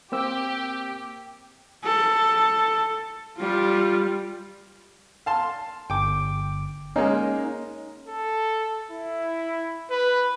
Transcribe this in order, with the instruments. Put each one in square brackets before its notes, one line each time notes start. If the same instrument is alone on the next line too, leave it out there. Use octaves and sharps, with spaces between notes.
[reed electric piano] A#3 C4 E6 [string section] G4
[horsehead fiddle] A4
G3 F4
[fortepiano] F5 A5 C6
[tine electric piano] G1 D6 [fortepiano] G5
[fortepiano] G#3 A#3 [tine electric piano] C#4 D#4
[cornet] A4
E4
B4